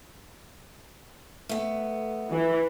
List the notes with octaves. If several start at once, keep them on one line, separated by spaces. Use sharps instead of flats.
A3 B3
E3